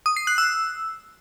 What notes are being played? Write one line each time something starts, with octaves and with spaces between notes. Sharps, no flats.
D#6
C7
F#6
E6